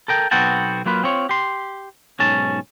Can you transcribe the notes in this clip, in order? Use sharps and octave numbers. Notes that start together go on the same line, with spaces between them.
A4 A#4 G5
B1 B3 C4 F#4 G5 A5
F#3 A#3 F4 B4
C4 F4 C#5
G4 C6
B1 G#2 C#4 A5